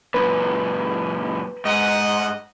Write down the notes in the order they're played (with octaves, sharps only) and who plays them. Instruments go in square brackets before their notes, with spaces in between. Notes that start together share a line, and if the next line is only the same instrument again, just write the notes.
[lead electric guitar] F#2 A#2 [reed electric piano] B4
[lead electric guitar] G#2 [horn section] D#5 F#5